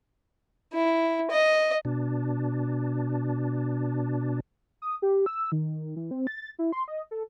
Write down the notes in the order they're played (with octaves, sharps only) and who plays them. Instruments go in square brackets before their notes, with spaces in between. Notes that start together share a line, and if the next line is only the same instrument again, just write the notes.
[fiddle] E4
D#5
[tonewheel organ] B2 D4
[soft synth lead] D#6
G4
E6
D#3
E3
C4
A6
E4
C6
D#5
A4